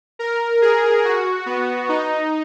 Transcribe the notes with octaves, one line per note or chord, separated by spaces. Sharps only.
A#4
G#4
F#4
B3
D#4